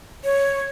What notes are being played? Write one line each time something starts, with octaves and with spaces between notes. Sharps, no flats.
C#5